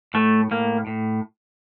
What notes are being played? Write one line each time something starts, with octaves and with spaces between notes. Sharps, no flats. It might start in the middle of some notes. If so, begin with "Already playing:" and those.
A2 A3
A2 A#3
A2